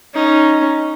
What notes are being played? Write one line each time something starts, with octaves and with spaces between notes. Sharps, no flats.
C#4 D#4